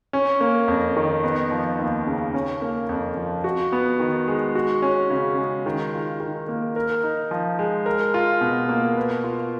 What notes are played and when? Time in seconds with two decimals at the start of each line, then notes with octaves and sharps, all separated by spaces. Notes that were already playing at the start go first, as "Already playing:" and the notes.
0.13 C#4
0.41 A#3
0.68 F2
0.97 D#3
1.24 B3
1.51 F3
1.79 D#2
2.07 C#3
2.34 C#4
2.62 A#3
2.89 F2
3.17 F3
3.44 F#4
3.72 B3
4.00 D#3
4.28 G#3
4.55 F#4
4.82 C#4
5.10 C#3
5.38 G#3
5.66 D#3
5.93 F4
6.20 D#3
6.48 A#3
6.76 A#4
7.03 D#4
7.31 F3
7.59 G#3
7.86 A#4
8.14 F4
8.41 B2
8.69 A#3
8.97 B4
9.24 F4